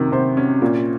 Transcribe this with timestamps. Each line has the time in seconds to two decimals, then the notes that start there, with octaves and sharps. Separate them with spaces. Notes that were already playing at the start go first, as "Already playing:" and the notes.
Already playing: C3 D#3 F#3 C#4
0.12 C3 C5
0.37 C#4
0.62 A#2